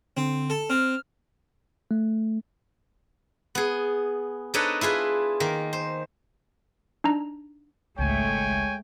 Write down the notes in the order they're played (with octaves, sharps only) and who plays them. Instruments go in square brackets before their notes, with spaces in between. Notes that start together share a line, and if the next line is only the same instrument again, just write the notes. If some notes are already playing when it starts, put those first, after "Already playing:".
[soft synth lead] D3 [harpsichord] C4
[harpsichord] A4
[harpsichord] C4 [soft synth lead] F6
[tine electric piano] A3
[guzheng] B3 G#4
D4 D#4 A4 B4 C#5 D#5
E4 F4 G#4 B4
D#3 A#3
C5
[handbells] D4 D#4 A#5
[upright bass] G#1 C#2 [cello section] G#3 A3 [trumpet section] C#5 G5 G#5